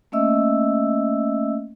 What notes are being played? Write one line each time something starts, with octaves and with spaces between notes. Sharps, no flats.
A3 A#3 C#4 D#5 E5 E6